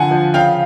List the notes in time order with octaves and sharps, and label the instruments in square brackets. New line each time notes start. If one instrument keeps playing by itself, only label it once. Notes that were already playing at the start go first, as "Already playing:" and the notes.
Already playing: [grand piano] D3 F3 F#5 G#5
F3
C#3 F5 G5